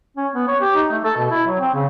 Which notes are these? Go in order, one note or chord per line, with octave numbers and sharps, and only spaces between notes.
C#4
B3
C#5
G4
D#4
A3
A4
B2
E4
F#3
C4
C#3